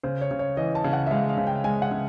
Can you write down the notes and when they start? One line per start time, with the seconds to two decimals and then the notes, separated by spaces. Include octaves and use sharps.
0.03 C#3 C5
0.21 C#5
0.31 C#3
0.39 C#5
0.57 E3 D#5
0.75 A5
0.84 C#3
0.93 F#5
1.07 E5
1.11 G#3 F5
1.29 F5
1.38 C#3
1.47 G5
1.64 G#3 G#5
1.82 F#5
1.91 C#3